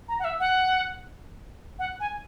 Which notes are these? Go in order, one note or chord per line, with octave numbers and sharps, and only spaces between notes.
A#5
F#5
E5
F#5
F#5
G#5